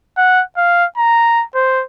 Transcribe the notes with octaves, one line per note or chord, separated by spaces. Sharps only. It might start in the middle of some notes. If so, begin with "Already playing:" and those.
F#5
F5
A#5
C5